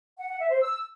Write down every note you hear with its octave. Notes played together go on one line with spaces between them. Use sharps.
F#5
F#5
E5
C5
E6